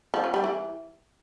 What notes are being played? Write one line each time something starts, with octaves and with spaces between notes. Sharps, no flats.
F3
C#4
G3
E3